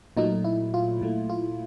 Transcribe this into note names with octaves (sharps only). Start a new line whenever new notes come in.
A#2 F#3 A3 D#4
E4
F4
A#2 F#3 A3
F4